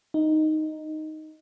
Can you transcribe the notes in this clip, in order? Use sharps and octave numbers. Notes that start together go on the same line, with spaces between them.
D#4